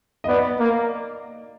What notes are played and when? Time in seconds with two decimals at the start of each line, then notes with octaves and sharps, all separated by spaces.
0.24 D#5
0.28 B3 D5
0.59 A#3